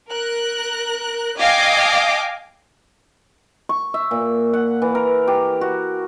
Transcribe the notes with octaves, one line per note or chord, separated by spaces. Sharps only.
A#4 F#6
D#5 F5 G5 G#5 D6
C#6
E5
A#2
F#5
E3
A#4
G4
F#4